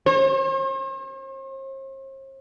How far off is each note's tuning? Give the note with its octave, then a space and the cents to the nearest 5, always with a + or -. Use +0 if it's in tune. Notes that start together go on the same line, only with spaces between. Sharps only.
C5 +45